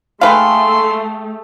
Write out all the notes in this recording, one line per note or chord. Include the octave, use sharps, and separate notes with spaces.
A3 G#4 A4 B4 F5 G5 C6